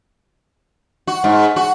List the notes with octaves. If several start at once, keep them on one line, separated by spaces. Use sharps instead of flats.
F#4
G#2
F#4